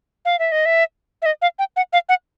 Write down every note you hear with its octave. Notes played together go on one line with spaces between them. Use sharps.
F5
E5
D#5
E5
E5
D#5
F5
G5
F#5
F5
F#5